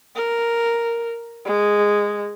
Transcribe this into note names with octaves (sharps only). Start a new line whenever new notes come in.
A#4
G#3